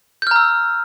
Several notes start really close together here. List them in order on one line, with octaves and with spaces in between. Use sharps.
G6 F6 A#5 E6